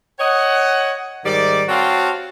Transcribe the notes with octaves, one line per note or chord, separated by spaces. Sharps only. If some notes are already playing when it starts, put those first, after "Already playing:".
C#5 D#5 F#5
G#2 D#3 G3 D5
C4 F#4 C5 C#5 F5 A5